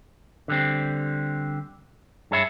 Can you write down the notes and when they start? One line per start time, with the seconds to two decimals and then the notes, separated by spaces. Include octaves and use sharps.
0.48 D3 G3 C4
2.31 G2 G#4 C#5 E5 B5